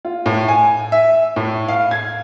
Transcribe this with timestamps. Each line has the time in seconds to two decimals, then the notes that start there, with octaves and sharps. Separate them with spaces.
0.05 F4
0.26 A2
0.48 G#5
0.92 E5
1.36 A2
1.68 F5
1.91 G#6